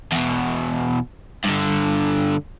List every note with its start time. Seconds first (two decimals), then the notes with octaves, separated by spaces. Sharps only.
0.12 E2 B2
1.45 G2 D3